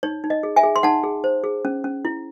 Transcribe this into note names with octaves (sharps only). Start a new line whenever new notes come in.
D#4 C#5
D#4
D#5
G#4
E5 G#5
G#4
C6
D#4 F#5 A5
G#4
C5
G#4
C#4
C#4
E4